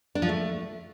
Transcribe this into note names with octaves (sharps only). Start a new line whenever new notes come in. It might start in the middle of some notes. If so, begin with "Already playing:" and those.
D4
F3
A3